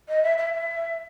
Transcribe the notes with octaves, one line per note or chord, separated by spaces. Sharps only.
D#5
E5
E5
E5